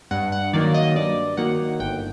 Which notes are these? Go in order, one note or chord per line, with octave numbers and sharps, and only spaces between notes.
G2 F#5
F#5
D#3 F#3 A#3 D#4 D5
D#5
G2 D5
D#3 F#3 A#3 D#4 F#5
G1 G5